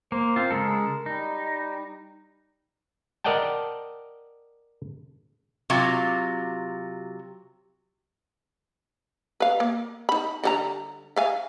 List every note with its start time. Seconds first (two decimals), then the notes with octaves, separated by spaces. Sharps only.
0.12 A#3 C5
0.36 C4 F4
0.50 C#3 G#3 A4 A#4
1.06 G3 D#4
3.24 A#4 D5 D#5 F#5 G5 A5
5.70 C3 F#3 F4
9.40 B4 F5
9.60 A#3
10.09 D#4 B5
10.43 D3 G3 A#5
11.16 E5 F5 G#5